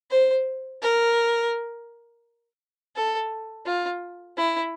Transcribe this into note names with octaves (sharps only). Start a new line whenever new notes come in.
C5
A#4
A4
F4
E4